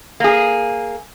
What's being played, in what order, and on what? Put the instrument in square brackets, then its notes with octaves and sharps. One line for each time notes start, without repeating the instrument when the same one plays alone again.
[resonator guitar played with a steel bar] A#3 G#4